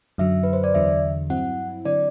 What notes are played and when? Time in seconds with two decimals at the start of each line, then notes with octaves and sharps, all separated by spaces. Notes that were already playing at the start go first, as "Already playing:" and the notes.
0.18 F#2 D3 F#3 E5
0.43 B4
0.53 C5
0.64 D5
0.75 E2 D3 F#3 E5
1.30 G2 F#3 C4 E4 F#5
1.85 D3 F#3 C4 E4 D5